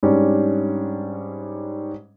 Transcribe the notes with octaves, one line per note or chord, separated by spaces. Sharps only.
G#2 G3 C#4 D4